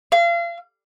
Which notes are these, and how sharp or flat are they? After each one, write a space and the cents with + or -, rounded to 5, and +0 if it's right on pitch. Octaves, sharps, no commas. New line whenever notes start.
F5 -35